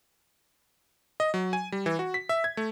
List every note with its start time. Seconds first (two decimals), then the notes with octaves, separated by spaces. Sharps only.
1.20 D#5
1.34 F#3
1.53 G#5
1.72 G3
1.86 E3
1.99 F#4
2.14 B6
2.29 E5
2.44 G#6
2.57 A3